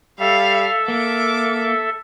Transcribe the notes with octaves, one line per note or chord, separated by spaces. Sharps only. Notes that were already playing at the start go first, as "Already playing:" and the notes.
G3 A4 E5 F5
A#3 F5 D6